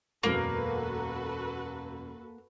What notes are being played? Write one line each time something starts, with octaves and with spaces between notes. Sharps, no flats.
E1 F#2 A#3 F#4 A4 B4